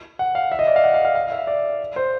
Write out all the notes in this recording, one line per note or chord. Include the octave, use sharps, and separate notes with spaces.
F#5
F5
E5
D#5
D5
F5
F#5
F5
F5
F5
E5
D5
C5